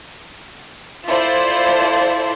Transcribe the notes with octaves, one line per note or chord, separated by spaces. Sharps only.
E4 F4 A4 C5 D5